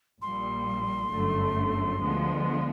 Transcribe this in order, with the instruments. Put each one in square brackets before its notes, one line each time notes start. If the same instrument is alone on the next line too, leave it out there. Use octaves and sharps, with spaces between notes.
[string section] A#1 A#2 G3 [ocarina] C6
[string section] G1 F#2 D3 F#3 A3
D2 D3 F3 G#3 B3